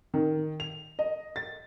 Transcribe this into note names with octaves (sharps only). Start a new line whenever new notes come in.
D#3
F7
D#5
A6